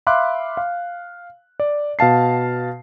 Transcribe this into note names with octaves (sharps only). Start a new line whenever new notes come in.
E5 F5 B5 C6 D6 F#6
F5
D5
B2 F5 A5 C7